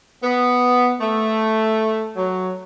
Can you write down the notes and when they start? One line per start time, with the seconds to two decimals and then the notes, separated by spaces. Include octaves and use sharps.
0.23 B3
1.01 A3
2.17 F#3